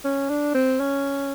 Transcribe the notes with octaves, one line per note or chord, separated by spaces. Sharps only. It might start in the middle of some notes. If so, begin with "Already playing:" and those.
C#4
D4
C4
C#4